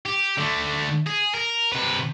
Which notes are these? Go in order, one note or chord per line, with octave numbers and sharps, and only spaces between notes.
G4
D3 A3
G#4
A#4
C3 B4